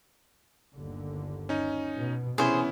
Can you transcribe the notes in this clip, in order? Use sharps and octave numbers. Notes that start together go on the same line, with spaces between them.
G1 D#2 D3
C#4 D#4
B2
C3 E3 B3 C#4 E4 G#4 C5